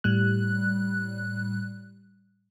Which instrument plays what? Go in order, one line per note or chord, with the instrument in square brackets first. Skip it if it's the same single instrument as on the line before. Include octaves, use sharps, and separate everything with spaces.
[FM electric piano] A2 G3 F#6